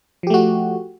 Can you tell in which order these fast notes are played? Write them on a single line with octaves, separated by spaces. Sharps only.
F3 G4 A3 F#4